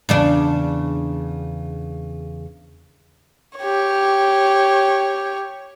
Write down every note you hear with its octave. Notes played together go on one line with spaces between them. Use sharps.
E2 C#3 D4
G4 C#5